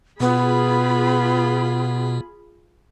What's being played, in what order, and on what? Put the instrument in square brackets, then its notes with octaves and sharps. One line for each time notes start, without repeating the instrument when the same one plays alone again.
[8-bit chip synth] B2 [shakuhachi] B3 [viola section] F4 G#4 B5